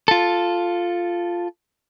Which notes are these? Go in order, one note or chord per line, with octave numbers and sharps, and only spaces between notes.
F4 A4